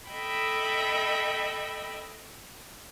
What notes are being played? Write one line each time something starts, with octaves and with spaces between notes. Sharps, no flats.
A4 D#5 E5 G5 B5